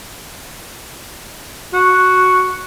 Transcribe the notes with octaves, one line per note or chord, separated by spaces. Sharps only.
F#4